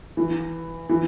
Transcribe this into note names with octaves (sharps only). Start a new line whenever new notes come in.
E3
E3